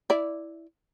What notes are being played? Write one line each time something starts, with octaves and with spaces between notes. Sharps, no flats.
E4 D5